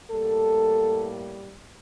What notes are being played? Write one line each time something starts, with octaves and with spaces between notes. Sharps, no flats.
A2 G3 A#3 A4